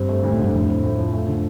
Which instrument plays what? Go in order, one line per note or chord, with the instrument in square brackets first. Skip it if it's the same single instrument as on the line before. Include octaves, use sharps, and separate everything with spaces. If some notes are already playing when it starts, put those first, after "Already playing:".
Already playing: [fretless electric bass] G2 [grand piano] G3 C4
[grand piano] A3
D2
[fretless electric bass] A2
[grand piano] D3
[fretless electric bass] G2
[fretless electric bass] F2 [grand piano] A2
[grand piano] C4
A2
F3
A3
D3